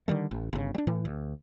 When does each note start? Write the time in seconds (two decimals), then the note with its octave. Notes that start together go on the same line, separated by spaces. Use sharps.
0.08 D3 D#3 G3 A3
0.31 A1
0.53 G1 C#3
0.75 G3 D4
0.87 A2 E3
1.05 D2